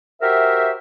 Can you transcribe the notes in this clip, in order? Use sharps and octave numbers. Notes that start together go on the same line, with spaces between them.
F#4 G4 A#4 C5 E5